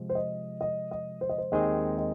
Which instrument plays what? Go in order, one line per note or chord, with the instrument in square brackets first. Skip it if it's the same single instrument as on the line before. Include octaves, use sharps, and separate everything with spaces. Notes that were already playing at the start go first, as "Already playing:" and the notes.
Already playing: [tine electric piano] C3 F3 G#3
[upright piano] C5
D#5
D#5
D#5
C5
D#5
C5
[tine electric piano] D#2 D#3 G#3 C4 G#4 [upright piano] D#5
[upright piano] D#5